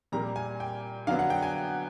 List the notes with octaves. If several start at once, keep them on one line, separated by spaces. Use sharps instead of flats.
A#2 G3 A#3 A#5
G#5
G5
D3 F#3 B3 F5
F#5
G5
G#5